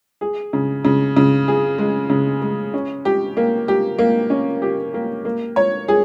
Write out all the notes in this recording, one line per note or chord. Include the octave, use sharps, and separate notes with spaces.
G#4
C#3
C#3
C#3
G#4
G#3
C#3
G#3
C#4
G4
A#3
G4
A#3
C#4
G4
A#3
A#3
C#5
G#4